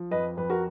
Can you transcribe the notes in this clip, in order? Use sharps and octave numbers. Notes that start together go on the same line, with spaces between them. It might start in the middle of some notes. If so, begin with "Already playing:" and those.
Already playing: F3
F2 B4 D#5
F2 B4
F#4 A#4